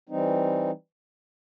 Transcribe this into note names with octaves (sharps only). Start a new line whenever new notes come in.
E3 G3 C4 D#4